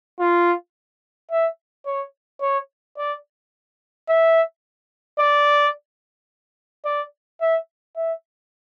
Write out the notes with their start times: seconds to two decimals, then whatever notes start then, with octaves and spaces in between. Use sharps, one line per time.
0.20 F4
1.31 E5
1.86 C#5
2.41 C#5
2.98 D5
4.08 E5
5.19 D5
6.85 D5
7.41 E5
7.96 E5